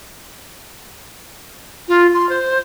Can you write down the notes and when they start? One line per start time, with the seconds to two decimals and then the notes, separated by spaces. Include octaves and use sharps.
1.88 F4
2.14 C6
2.29 C5